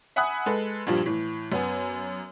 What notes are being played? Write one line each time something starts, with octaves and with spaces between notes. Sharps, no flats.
E5 F#5 G#5 B5 D#6 F#6
G#3 A4 B4
G2 A#2 F3 G3
A2 E3
F#2 B3 G#5